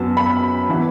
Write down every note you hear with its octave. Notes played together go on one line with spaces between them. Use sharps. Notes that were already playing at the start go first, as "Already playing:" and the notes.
Already playing: F#2 F#3 B3 A5
B5
E3 B3